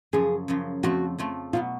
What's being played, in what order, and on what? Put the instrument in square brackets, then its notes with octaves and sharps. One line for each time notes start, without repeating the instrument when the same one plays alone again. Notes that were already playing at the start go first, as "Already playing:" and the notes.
[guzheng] F#2 C#3 F3 [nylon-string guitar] G#4
[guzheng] F#2 C#3 F3
[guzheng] F2 F3 A3 [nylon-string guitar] F#4
[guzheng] F2 F3 A3
[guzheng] B2 F#3 B3 [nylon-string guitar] F4